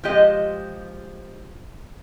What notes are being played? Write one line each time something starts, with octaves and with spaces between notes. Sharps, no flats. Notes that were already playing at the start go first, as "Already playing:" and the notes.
F3 G#3 G4 D#5